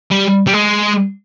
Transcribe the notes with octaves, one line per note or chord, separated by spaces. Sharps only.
G3
G3
G#3